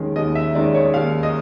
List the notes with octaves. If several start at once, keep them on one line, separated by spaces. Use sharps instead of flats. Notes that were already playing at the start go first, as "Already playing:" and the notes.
Already playing: D#2 D#3 G#3 C#4
D#2 D#5
E5
D#3 G#3 C#4 D5
C#5
D#2 F5
D#5